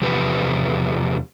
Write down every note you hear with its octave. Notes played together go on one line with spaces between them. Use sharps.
E2 C3 F3 G4 B4